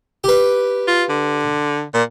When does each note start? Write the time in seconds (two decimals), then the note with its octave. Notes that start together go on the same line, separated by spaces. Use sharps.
0.24 G4 B4
0.88 F4
1.09 D3
1.94 A#2